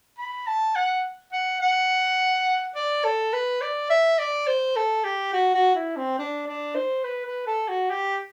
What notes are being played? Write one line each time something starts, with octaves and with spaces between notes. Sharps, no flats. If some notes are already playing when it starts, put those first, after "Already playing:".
B5
A5
F#5
F#5
F#5
D5
A4
B4
D5
E5
D5
C5
A4
G4
F#4
F#4
E4
C4
D4
D4
C5
B4
B4
A4
F#4
G4